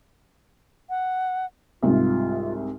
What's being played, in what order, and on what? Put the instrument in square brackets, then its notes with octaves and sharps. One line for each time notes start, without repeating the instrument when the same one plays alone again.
[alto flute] F#5
[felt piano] C2 G#2 C3 [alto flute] F4